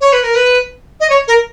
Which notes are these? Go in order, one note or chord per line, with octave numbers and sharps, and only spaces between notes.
C#5
B4
A#4
B4
D#5
C#5
A#4